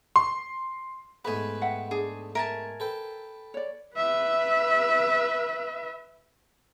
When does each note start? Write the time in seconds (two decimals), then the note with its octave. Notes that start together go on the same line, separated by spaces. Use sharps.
0.16 C6
1.25 G#2 A3 B3 B4 G#5
1.61 E5 F#5 G5
1.91 D4 G#4
2.35 A#4 E5 G#5 A5
2.80 A4 B4 G5
3.54 C#5 D5
3.96 B4 E5